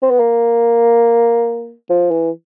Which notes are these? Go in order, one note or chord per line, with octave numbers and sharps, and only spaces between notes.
C4
B3
A#3
F3
E3